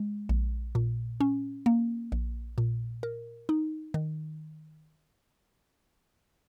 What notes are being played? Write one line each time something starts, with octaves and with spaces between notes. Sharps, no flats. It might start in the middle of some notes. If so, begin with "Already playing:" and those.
Already playing: G#3
A#1
A#2
C#4
A#3
A#1
A#2
A#4
D#4
D#3